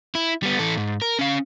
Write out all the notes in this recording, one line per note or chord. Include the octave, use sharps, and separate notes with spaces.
E4
G3 B3
E3 A4
G#2
A#4
C#4 F5